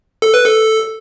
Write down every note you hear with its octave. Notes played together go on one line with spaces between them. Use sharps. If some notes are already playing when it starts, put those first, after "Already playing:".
A4
B4
A4